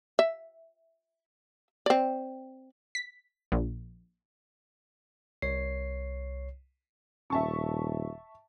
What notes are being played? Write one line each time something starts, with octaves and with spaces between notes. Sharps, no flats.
E5
C4 D5
B6
A#1
C2 C#5 C7
D#1 E5 A5 C#6